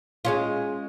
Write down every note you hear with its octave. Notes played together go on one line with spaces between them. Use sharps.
G#3 C#4 F4